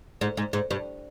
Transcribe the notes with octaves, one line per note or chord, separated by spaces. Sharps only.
G#2
G#2
G#2
G2